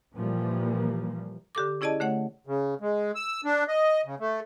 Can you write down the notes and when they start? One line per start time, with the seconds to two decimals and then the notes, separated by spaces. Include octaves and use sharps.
0.15 A#2 E3 F3 G3 A#3
1.55 D3 G4 A4 D6
1.81 C#4 E4 G#4 D5 D#5 A5
2.00 D3 A3 C#5 F#5
2.47 C#3
2.81 G#3
3.15 E6
3.45 D4
3.68 D#5
4.05 C#3
4.20 A3